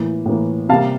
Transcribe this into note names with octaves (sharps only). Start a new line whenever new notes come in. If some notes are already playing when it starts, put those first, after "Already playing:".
Already playing: A2 E3 A#3
A2 E3 A#3
C3 G3 A#3 F5 A5